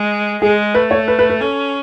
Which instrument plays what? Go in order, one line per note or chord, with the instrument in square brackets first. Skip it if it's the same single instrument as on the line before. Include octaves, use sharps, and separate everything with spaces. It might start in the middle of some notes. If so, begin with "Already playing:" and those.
Already playing: [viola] G#3
[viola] G#3 [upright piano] G#4
[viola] A3 [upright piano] B4
[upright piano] C#5
B4
B4
B4
[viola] C#4 [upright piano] A4